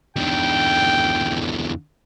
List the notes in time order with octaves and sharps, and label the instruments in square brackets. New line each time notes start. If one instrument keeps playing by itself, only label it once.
[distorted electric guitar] E2 D3 [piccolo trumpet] G5